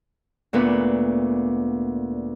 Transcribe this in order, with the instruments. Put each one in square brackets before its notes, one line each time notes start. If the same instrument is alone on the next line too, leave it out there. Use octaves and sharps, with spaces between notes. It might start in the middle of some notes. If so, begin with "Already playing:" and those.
[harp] D2 A#2 B3 B4